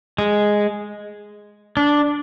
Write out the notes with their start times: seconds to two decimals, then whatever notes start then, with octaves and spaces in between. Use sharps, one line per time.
0.18 G#3
1.77 D4